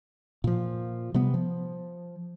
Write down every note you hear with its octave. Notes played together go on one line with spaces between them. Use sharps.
A#2 F3
C3 G3 B3
F3